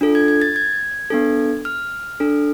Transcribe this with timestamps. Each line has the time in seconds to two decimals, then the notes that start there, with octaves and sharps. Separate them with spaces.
0.01 D4 F4 A4
0.15 G#6
0.28 G#6
0.42 A6
0.56 G#6
1.10 B3 D4 A4
1.65 F6
2.20 D4 A4